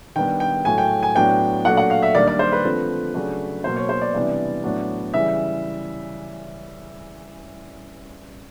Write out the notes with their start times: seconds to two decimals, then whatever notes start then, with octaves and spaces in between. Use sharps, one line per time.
0.16 D#3 G3 B3 D4 G5
0.40 G5
0.65 A2 F#3 A3 G#5
0.78 G5
1.03 G#5
1.15 A2 F#3 B3 D4 G5
1.65 A#2 F#3 A3 D4 F#5
1.77 F#5
1.90 F5
2.02 E5
2.15 D#3 G3 A#3 D4 D5
2.27 D5
2.39 C5
2.52 B4
2.65 D3 F3 A3 C4
3.14 C#3 F#3 A3 D4
3.64 B2 F#3 A#3 C5
3.76 C#5
3.89 C5
4.01 D5
4.13 C3 E3 G3 B3 D4
4.64 A2 F#3 B3 D4
5.13 C#3 E3 G3 E5